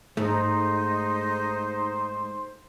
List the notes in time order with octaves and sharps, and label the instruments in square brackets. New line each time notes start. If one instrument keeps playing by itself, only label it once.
[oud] G#2 [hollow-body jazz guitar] A3 [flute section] D#4 [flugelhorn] C5